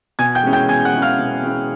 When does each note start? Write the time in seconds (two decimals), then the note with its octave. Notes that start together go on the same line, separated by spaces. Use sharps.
0.19 B2 G#5 G#6
0.35 G5 G6
0.44 G#3 C#4 E4
0.53 G5 G6
0.69 B2 G#5 G#6
0.85 F#5 F#6
0.93 G#3 C#4 E4
1.02 F5 F6
1.18 B2
1.43 G#3 C#4 E4